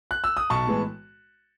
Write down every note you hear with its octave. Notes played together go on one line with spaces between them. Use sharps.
F#6
E6
D#6
B1 A5 C#6
A2 E3 G#3 B3